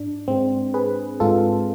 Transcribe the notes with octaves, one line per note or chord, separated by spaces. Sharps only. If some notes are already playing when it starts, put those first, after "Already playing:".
Already playing: G#2 D4
G#2 G#3 C4
G#4 B4
G#2 G#3 F4 A4